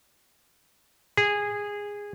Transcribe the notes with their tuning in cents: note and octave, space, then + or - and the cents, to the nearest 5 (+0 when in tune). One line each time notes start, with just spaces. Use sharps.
G#4 -15